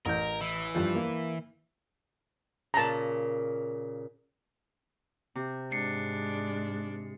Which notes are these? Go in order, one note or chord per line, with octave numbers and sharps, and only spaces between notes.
A1 A#4 G6
E3
G2 F3
A#3
A#2 C#3 A5 A#5
C3
G#2 G#3 D4 C7 C#7